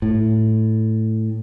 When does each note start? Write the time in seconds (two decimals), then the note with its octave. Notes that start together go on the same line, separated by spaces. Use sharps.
0.02 A2